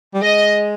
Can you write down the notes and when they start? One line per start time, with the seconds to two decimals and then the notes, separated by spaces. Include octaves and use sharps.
0.14 G3
0.22 G#3 D#5